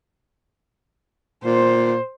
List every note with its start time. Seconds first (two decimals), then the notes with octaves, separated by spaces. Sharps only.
1.45 A#2 C5